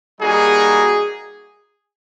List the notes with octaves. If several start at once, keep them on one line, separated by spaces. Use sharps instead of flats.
G3 A#3 D#4 F#4 G#4